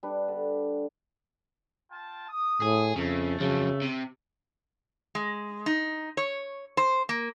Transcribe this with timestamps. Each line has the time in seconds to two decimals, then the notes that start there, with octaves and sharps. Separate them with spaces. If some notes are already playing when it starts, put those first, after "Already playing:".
0.03 G3 D4 B4
0.28 D3
1.91 F4 G5 A5
2.29 D#6
2.62 A2 G#4
2.96 F2 C#3 A3
3.40 F2 C#3 F#3
3.82 C3
5.15 G#3
5.66 D#4
6.17 C#5
6.77 C5
7.09 A#3